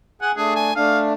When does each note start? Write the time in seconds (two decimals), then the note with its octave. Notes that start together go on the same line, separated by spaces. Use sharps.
0.22 G#4 F#5 G#5
0.37 A3 D4 G#4
0.56 G#5
0.76 A3 D4 F5